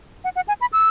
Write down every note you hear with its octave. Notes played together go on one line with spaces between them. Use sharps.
F#5
F#5
G#5
B5
E6